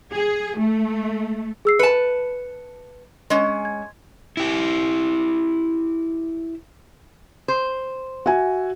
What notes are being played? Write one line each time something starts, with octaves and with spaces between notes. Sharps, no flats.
G#4
A3
G#4 E6 C7
B4 A5 C#7 E7
G#3 C#4
G#6
E4 G4
C5
F#4 E5 G#5